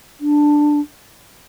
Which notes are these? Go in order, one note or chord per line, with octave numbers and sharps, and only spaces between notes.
D4